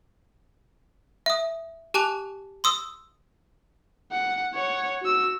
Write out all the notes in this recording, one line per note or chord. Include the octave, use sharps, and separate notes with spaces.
E5 D#6
G4 G#5 A5 D6 F#6 F7
C6 D#6 E6
F#5
C#5 F#5
F#4 E6